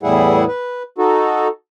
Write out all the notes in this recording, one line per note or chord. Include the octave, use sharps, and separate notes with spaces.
E2 A2 G3 E4 G#4 F#5
B4
D#4 F#4 A4